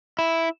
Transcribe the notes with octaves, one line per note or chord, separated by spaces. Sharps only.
E4